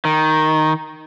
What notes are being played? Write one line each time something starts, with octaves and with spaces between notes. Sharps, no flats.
D#3